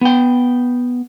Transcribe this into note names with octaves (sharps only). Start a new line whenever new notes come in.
B3 G5